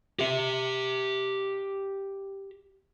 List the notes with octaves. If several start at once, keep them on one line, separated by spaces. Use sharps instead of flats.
G4 E5